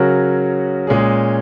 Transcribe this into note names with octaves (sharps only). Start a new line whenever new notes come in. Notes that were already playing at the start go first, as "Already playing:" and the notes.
Already playing: C#3 F#3 C#4 F#4 A#4
A#2 G#3 C#4 G#4